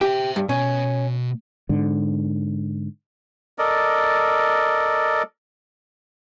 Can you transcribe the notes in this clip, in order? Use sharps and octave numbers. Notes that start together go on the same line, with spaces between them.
G4 C5 E5
G2
B2 C#4
G#2 D3
A4 A#4 D5 D#5